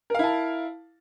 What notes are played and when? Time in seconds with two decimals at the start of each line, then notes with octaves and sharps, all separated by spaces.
0.10 A#4
0.14 F5
0.19 E4
0.24 A5